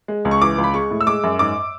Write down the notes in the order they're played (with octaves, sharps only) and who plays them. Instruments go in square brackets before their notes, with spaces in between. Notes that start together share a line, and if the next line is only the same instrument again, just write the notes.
[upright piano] G#3
C#2
C#6
E3 D6
C#2
B5
G#3 C#6
A2
E6
G#3 D6
F#2
G#2 D6